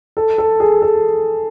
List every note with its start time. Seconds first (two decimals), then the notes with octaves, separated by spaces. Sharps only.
0.17 A4
0.38 A4
0.60 G#4
0.82 A4